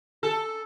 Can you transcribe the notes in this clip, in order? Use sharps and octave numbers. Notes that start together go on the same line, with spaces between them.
A4